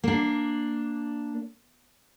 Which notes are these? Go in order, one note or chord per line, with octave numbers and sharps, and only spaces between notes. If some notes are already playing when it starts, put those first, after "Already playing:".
A#3 D4